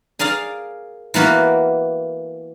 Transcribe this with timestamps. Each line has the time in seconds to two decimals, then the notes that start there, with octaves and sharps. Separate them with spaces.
0.19 G#4 A#4 D5 F5
1.14 E3 A#3 B3 F#4 A#4